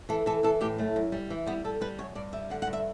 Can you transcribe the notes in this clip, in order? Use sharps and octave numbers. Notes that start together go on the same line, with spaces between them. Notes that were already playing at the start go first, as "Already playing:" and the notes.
E3 A4
E3 A4
E3 A4
A2 G4
F#2 A3
F#2
G3
E3
G3 B3
G3 A4
G3 B4
F#2 C#5
G2 D5
G3 E5
D3 F#5
F#5
G2
E5